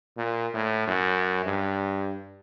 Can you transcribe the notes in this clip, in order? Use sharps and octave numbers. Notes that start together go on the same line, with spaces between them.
A#2
A2
F#2
G2